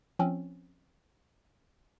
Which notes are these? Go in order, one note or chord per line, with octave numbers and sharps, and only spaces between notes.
F3 C4 C#4